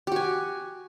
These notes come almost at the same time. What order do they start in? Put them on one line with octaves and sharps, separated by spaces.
G4 F#4 G#5